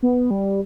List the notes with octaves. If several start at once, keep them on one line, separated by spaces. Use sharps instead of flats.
B3
G3